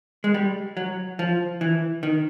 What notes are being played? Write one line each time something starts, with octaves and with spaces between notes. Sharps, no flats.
G#3
G3
F#3
F3
E3
D#3